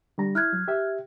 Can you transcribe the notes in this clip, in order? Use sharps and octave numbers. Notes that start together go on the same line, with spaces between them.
D3 G3 A#5
E4 F6 F#6 G#6
F#3
G4 E5